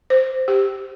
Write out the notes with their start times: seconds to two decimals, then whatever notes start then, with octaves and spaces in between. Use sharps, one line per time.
0.10 C5
0.48 G4